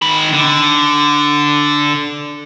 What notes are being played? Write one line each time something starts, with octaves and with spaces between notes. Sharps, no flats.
D#3 B5
D3